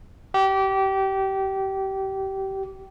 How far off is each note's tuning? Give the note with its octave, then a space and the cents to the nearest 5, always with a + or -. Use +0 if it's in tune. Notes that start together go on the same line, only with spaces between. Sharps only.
G4 -25